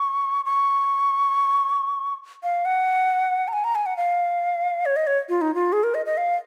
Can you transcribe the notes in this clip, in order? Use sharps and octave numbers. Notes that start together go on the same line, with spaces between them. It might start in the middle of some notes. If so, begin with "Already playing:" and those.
Already playing: C#6
C#6
F5
F#5
A#5
G#5
A#5
G#5
F#5
F5
C#5
D#5
C#5
F4
D#4
F4
G#4
A#4
D#5
D#5
F5